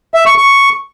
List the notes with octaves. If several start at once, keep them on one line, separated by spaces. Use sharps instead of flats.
E5
C#6
C#6